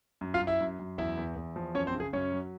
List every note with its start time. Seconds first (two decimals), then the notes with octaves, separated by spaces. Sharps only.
0.21 F#2
0.34 F4 F5
0.41 F#2
0.47 E4 E5
0.60 F#2
0.79 F#2
0.98 E2 E4 E5
1.17 E2
1.36 E2
1.56 F3
1.75 F#2 C#4 C#5
1.87 C4 C5
1.95 C#3
2.00 G#4
2.13 F#2 C#4 C#5
2.32 F#3